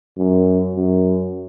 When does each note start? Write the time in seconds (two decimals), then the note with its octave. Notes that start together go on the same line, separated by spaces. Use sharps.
0.17 F#2
0.75 F#2